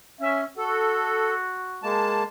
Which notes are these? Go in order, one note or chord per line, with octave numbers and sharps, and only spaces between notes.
C#4 E5
F#4 A4
G#3 A#3 A5